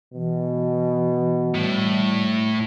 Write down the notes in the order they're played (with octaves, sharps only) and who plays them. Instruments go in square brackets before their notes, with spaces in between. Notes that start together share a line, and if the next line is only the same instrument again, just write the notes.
[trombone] B2 [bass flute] E3
[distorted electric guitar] A2 [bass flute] G3